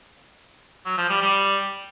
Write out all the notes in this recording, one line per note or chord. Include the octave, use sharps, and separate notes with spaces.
F#3
F3
G3
G3